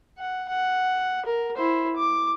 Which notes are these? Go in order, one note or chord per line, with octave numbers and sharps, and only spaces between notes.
F#5
F#5
A#4
E4 C5
D6